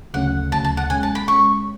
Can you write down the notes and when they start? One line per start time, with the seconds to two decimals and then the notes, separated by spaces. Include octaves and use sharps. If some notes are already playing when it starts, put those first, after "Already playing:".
0.14 D2 C#3 F#3 A3 C#4 F#5
0.52 D2 C#3 F#3 A3 C#4 A5
0.65 A5
0.77 F#5
0.90 B2 G#3 C#4 G#5
1.03 A5
1.15 B5
1.28 B2 G#3 C#4 C#6